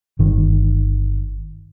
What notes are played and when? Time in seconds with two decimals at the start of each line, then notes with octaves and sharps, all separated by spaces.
0.19 G1 D#3